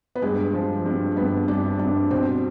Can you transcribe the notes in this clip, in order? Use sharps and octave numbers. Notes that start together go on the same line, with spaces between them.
B3
G2 G#3
F3
G2
G2 B3
G2 D4
G2 D4
B2 C4